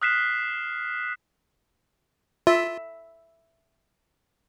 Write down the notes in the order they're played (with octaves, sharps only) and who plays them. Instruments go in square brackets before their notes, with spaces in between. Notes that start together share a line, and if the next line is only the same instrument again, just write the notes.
[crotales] D#6 F6 F#6 B6 C7 E7
[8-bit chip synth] F4 [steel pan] E5